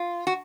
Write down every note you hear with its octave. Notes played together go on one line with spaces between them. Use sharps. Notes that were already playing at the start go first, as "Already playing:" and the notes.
Already playing: F4
F#4